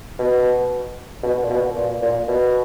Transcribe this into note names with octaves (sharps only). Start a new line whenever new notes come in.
B2
B2
A#2
B2
A#2
A#2
B2